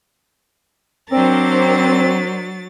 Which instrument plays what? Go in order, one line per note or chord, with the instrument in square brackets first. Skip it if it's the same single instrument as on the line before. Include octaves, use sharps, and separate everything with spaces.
[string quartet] F#3 A6 [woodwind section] C4 [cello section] D4 A#4 C5